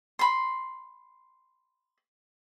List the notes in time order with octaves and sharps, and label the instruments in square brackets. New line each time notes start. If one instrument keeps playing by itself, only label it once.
[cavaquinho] B5 C6